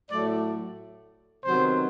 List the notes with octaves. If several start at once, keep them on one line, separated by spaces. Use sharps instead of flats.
A2 F#3 A3 D5
C3 D#3 F#3 B3 C5